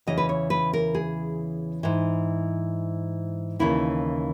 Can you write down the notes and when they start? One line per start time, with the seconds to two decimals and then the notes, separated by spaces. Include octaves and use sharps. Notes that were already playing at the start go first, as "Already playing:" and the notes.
0.07 E2 C#3 E3 D#5
0.18 B4
0.29 C#5
0.50 B4
0.73 A#4
0.95 G#4
1.83 G#2 E3
3.59 D#2 C#3 E3 E4